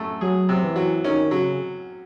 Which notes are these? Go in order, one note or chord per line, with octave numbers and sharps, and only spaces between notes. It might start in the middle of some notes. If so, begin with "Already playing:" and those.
Already playing: F#2 A3
F#3 G#4
C3
E3
F#3
D#3 C#4
C#3 F#3